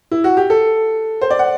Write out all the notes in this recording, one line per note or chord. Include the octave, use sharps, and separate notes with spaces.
E4
F#4
G4
A4
C5
D5
F#5